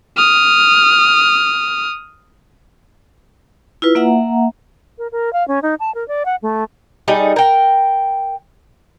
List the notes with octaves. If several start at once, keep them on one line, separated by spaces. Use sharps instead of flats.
D#6 F6
E4 F4 B4
A#3 E5 F#5 A#5
A#4
A#4
F5
C#4
D#4
A5
A#4
D5
F#5
A3
G3 D#4 G#4 A4
A#4 G5